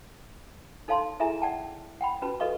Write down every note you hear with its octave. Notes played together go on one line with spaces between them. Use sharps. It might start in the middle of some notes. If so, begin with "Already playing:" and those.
D#4 A4 C#5 F5 A5 C6
E4 G#4 A4 E5 G#5 A#5
D5 F#5 G5 A5
F#5 G5 B5
C#4 F#4 B4 A5
F#4 A4 B4 D#5 F5 C#6